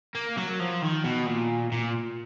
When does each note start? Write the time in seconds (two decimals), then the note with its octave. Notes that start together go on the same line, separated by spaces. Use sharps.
0.15 A#3
0.37 F#3
0.60 F3
0.82 D#3
1.04 B2
1.26 A#2
1.72 A#2